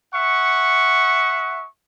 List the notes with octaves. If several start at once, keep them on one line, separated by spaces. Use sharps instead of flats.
E5 F#5 C#6